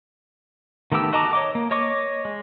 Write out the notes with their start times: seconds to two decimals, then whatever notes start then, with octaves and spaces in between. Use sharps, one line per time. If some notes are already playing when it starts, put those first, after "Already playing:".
0.92 D#3 A3 B3 G4 E6
1.13 F#4 D#5 A5 A#5 D6
1.33 C#5 D#5 D6
1.55 A#3
1.71 C#5 D#5 C#6 D6
2.25 G#3